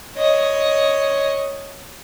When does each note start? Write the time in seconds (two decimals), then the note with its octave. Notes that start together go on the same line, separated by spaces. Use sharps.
0.17 C#5 D#5